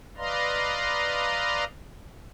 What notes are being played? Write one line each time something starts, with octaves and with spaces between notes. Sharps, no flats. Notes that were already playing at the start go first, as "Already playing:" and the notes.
B4 D5 D#5 F5 A#5 C6